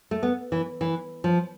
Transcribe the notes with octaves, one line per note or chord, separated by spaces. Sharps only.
A3
B3
E3
E3
F3